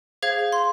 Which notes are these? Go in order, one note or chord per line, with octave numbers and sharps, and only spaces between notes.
G#4 C5 F5 G#6
C6